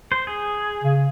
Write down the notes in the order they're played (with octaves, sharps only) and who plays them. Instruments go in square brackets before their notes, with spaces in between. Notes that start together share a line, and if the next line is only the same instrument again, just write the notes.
[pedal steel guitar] C5
G#4
[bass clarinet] C#3